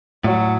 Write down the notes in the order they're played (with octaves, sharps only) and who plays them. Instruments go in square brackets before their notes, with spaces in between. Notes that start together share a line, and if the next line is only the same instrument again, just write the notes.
[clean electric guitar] A2 [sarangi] F#3